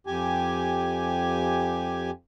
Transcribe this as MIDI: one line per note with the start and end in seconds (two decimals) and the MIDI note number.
0.07 2.11 41
0.07 2.11 67
0.07 2.11 80